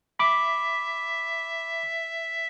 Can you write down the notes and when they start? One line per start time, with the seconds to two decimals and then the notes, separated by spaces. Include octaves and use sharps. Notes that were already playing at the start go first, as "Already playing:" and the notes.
0.19 E5 B5 D6